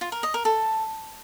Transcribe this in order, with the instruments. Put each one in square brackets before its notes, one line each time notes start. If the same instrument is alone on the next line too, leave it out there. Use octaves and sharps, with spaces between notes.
[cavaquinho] F4
A#4
D#5
A#4
A4